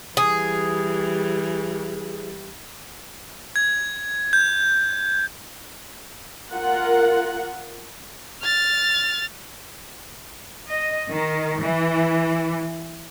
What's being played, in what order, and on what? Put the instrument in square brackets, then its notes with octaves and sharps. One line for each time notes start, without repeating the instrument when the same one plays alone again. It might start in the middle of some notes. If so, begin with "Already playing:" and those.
[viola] E3 G3 [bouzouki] G#4
[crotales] G#6
G6
[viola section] F4 A#4 F#5
[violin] F6 A6
[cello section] D#5
D#3
E3